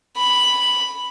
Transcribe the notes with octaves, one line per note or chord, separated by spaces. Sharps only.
B5